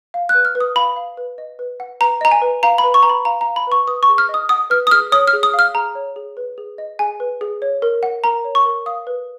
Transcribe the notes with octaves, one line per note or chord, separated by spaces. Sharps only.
F5
F#6
B4
F6
B4
D#6
F5 B5
F5
B4
D#5
B4
F#5
B4 A#5
D#5 A#5
G#5
B4
F5 A#5
B5
B4
C#6
B4 A#5
B5
F5 A#5
A#5
F5
B5
B4 C#6
B4 D#6
C#6
G#4
F6
D#5
D#6
F#5 D#6
B4 F6
D#6
G#4 F6
C#5 D#6
F6
G#4
D#6
F5
F6
G#4 A#5
C#5
G#4
B4
G#4
D#5
G#4 G#5
B4
G#4
C#5
A#4
F#5
A#4 A#5
C#5
C#6
A#4
F5 D#6
B4